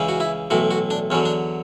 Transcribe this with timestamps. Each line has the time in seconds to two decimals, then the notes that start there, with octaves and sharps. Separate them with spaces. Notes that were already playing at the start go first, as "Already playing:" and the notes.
Already playing: C#2 C#3 E3
0.09 F#4
0.20 E4
0.50 B1 A2 E3 F#4
0.71 F#4
0.90 D4
1.10 E2 D3 F#3 C#4
1.25 D4